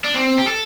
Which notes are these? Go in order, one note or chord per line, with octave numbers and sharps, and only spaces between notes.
D4
C4
G4
A4